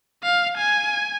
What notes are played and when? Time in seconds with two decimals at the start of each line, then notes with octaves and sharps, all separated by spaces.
0.23 F5
0.57 G#5